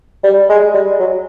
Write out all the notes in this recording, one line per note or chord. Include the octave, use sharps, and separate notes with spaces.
G3
G#3
G3
F#3